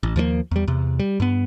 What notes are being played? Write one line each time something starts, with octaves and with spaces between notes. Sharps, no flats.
A1
D#2 F3 G3 A#3
E2 G3
E2 C3
G3
G2 B3